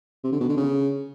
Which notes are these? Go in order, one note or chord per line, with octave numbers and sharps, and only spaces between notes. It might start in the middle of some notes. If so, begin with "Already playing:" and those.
C3
D3
B2
D3
C#3